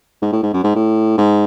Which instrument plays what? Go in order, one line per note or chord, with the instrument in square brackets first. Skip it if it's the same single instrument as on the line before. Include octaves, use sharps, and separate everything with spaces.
[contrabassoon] G#2
A2
G#2
F#2
G#2
A2
G#2